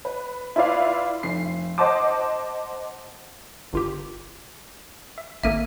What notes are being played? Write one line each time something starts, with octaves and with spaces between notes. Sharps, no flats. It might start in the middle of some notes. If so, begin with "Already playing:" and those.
B4
E4 F4 B4 D5 F5
F1 C7
C5 D#5 F#5 A5 C6 D6
G1 F4 G4
E5
G#1 A#3 A4 E5 D#7